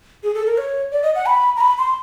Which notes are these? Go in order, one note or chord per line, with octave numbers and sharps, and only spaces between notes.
G#4
A4
A#4
C#5
D5
D#5
F#5
B5
A#5
B5
C6